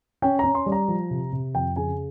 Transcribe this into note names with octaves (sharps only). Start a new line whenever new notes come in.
C#4 G5
C#4 A#5
C6
G3
A#5
F3
C3
C3
F2 G5
C#3 G#5